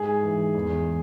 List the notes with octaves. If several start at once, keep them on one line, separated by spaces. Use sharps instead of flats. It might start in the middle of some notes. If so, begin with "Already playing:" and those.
Already playing: G#2 G#4 G#5
E3
E2